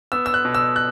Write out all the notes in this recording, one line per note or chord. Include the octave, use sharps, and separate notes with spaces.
B3 E6
E6
F#6
B2
E6
F#6